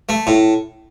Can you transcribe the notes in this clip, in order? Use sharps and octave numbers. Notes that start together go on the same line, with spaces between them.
A3
A2